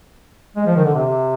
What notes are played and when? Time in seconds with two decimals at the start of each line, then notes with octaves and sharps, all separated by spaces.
0.56 G#3
0.66 F3
0.76 D#3
0.85 D3
0.94 C3